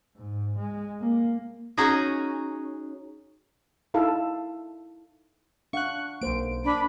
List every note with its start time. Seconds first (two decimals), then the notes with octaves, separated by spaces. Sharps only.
0.17 G#2
0.57 G#3
1.01 A#3
1.77 C#4 D#4 F#4 G#4 D#5
3.94 D#4 E4 A4 F5
5.73 D4 F5 F#5 C#6 F#6
6.21 B1 A#3 C5 D7
6.65 D4 B5